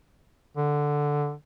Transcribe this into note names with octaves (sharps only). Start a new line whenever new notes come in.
D3